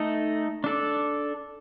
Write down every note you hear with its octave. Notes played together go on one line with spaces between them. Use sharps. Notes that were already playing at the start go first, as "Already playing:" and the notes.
Already playing: A3 D#4 A4 D#5
D4 A4 D5